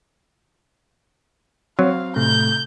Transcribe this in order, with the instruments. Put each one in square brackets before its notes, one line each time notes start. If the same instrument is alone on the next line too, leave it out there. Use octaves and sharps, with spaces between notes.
[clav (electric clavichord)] F#3 [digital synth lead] C4 [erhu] F5
[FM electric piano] A2 C3 A3 [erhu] G6